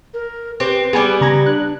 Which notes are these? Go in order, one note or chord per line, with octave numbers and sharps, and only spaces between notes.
A#4
C4 G4 B4
G3 B3 G#4 G#5 D6
C#3 A#5 G#6
D4 F#6